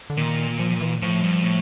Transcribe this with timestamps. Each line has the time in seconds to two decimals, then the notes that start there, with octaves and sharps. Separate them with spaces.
0.10 D3
0.17 A#2 D#3
0.59 F3
0.81 E3
1.02 A2 F3
1.22 G2
1.44 A2